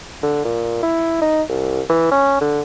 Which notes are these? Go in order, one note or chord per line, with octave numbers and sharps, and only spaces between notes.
D3
A#2
E4
D#4
C2
E3
C#4
D3